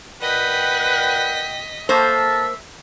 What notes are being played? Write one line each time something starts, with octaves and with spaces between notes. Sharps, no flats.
A#2 B4 D#5 F#5 G5 B6
A#3 A4 A#4 C5 E5 A5